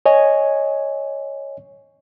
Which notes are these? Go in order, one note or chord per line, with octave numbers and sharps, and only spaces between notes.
C#5 D#5 G#5